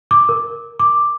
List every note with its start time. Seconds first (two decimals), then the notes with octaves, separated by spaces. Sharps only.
0.11 D6
0.29 A#4
0.79 D6